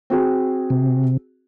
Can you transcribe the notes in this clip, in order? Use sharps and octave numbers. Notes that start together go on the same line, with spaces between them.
C4 F#4 G#4
C3